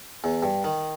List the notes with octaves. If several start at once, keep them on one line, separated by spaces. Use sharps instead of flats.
E2
G2
D#3